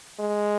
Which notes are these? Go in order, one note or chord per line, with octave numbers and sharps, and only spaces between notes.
G#3